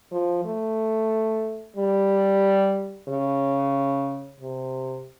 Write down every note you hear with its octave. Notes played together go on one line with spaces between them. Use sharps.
F3
A3
G3
C#3
C3